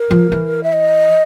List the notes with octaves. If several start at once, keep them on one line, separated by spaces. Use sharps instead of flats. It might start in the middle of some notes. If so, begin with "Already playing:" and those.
Already playing: A#4
F3
E3
E5
D#5